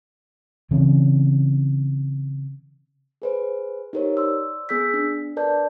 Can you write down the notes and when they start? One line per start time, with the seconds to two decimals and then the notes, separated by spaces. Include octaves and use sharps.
0.71 C#3 E3 C4 C#4
3.22 G#4 B4 C5
3.93 D#4 G4 A#4 C5 C#5
4.17 D5 C6 E6
4.69 B3 G#4 E6 G6 B6
4.94 D4
5.37 A#4 B4 D5 A5 G6